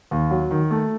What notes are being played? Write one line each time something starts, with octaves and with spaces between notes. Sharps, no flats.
D#2
F#3
D#3
A3